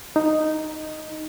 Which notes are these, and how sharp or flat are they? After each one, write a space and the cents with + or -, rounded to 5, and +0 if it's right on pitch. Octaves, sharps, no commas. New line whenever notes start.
D#4 -5